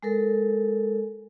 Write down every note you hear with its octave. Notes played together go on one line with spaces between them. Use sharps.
G#3 A4 A#4